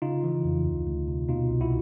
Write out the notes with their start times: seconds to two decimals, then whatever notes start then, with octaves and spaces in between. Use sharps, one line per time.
0.02 C#3 D#4 F4
0.24 E3
0.44 F2
0.65 D2
0.87 D2
1.08 C3
1.29 B2 D#4 F4
1.50 C2
1.61 E4 F#4